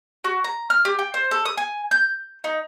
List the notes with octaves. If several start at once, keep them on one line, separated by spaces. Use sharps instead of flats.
F#4
A#5
F6
G4
G5
C5
A4
D#6
G#5
G6
D#4